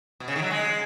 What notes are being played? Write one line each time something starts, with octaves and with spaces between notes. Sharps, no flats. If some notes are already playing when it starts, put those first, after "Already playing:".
B2
C#3
D#3
F#3
G#3